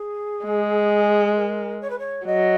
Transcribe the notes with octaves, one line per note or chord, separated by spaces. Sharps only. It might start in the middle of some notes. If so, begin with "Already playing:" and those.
Already playing: G#4
G#3
A#4
C#5
B4
C#5
F#3 D#5